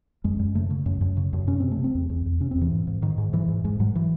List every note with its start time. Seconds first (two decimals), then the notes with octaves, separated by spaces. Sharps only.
0.24 F#2 G#3
0.39 F#2
0.55 C#3 A3
0.70 C#3
0.86 F#2
1.01 F#2
1.17 C#3
1.33 F#2
1.47 C3 C#4
1.60 C3 C4
1.72 A3
1.79 C3
1.84 C4
1.95 E2
2.09 E2
2.26 E2
2.40 C3 C#4
2.51 E2 C4
2.62 E3
2.72 G#2
2.87 G#2
3.02 G#2 D#3
3.18 G#2
3.33 G#2 E3
3.48 G#2
3.65 G#2 G#3
3.80 G#2 F#3
3.95 E3